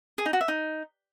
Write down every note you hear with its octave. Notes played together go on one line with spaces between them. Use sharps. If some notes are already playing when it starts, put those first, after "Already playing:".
G#4
D#4
F#4
E5
D#4